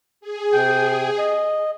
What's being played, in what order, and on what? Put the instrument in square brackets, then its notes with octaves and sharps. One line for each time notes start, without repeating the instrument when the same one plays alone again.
[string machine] G#4
[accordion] C3 G5 G6
D#5